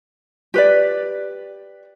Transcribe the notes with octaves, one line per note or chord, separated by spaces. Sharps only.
G4 B4 D5